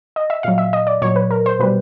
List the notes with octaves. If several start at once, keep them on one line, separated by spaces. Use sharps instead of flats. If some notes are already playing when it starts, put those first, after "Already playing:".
D#5
E5
A#2 F#3 F5
E5
D#5
D5
A#2 F#3 C#5
B4
A#4
C5
B2 G3 B4